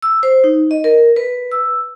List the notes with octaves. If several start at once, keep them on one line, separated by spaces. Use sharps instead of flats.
E6
C5
D#4
D#5
A#4
B4
E6